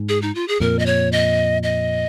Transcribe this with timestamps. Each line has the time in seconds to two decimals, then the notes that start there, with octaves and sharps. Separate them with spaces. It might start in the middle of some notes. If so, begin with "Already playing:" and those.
Already playing: G#2
0.09 G#4
0.22 D#4
0.35 F4
0.48 G#4
0.60 F2 A#2 A#4
0.79 D#5
0.86 C#5
1.12 D#5
1.63 D#5